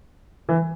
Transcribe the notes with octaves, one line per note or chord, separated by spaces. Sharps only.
E3